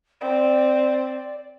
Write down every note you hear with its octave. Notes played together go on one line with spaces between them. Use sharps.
C4 D5